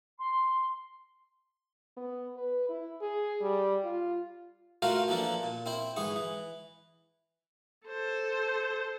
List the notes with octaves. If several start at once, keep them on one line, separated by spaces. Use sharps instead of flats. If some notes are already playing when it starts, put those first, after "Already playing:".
C6
B3
B4
E4
G#4
G3
F4
A3 F4 F#4 A#4 C5 F5
E3 F3 A#3 D4 A4
A#2
C4 E4 C5
G#2 E3 G#4 C#6
E3
A4 C5